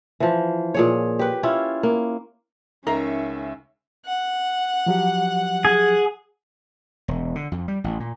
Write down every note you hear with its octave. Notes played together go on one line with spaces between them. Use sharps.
E3 F3
A#2 G#4 C#5
G4 B4
C#4 E4 F4
A#3
C#2 C#4 D#4 A#4 E5 C7
F#5
F3 F#3 G4
G#4
E1
D3
F2
G3
A1
A#2